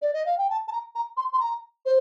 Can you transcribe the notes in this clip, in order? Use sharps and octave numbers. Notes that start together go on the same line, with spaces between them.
D5
D#5
F5
G5
A5
A5
A#5
A#5
C6
C6
A#5
C5